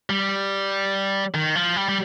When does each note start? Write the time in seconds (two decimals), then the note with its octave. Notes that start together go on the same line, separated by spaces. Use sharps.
0.10 G3
1.34 D#3
1.55 F3
1.76 G3
1.89 G3